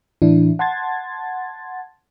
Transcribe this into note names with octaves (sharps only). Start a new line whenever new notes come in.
A2 E3 D4 E4
F#5 A5 C6 G#6 A6